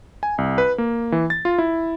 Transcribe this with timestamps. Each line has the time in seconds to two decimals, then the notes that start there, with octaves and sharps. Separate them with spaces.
0.23 G#5
0.38 C2
0.58 B4
0.78 A#3
1.12 E3
1.30 A6
1.45 F4
1.58 E4